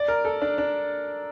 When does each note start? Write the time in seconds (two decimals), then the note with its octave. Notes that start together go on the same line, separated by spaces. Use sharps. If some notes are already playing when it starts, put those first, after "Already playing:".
Already playing: D5
0.08 A#4
0.25 A4
0.42 D4
0.58 D4